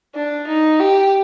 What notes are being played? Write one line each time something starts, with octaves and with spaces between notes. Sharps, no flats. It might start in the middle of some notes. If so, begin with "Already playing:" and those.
D4
D#4
G4